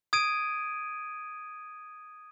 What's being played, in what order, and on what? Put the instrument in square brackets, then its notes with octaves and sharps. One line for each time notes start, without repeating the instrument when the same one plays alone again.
[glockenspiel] D#6 G#6 D7 D#7